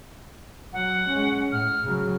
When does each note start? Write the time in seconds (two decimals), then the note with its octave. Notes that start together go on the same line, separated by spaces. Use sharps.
0.73 F#3 F#5
1.09 G#3 C#4
1.52 A2 F6
1.84 C#3 F#3